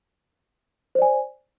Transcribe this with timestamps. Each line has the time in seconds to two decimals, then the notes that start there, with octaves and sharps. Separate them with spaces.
0.95 C5
0.99 D5
1.02 G#5